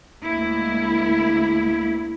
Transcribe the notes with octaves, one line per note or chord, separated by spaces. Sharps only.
D2 G#3 A#3 E4